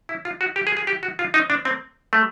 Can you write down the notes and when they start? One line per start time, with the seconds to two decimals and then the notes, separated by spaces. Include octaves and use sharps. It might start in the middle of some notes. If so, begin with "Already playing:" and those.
0.09 E4
0.25 F4
0.41 F#4
0.56 G4
0.67 G#4
0.77 G#4
0.87 G4
1.03 F#4
1.19 F4
1.34 D#4
1.50 D4
1.65 C4
2.13 A3